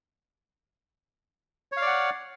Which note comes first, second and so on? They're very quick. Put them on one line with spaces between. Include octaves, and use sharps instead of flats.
C#5 F5 D5 F#5